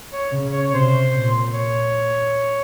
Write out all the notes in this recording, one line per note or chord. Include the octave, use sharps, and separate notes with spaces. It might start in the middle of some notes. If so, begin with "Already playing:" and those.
C#5
C#3
C#5
C#5
C3 C5
A#2
C#5